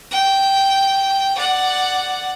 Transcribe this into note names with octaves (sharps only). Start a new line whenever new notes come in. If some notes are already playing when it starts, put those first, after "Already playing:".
G5
D5 F#5